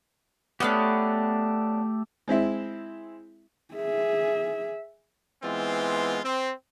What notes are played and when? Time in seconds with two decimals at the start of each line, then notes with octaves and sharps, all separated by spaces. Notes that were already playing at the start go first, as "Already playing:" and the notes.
0.60 A3 B3 C#4 D4 G4
2.28 G#3 C4 E4 E5
3.74 G#4 E5
5.44 E3 G#3 B3 C4 F4
6.24 C4